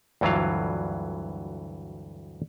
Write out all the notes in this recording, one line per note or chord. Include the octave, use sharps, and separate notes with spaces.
D2 G2 E3 F#3 F4 F5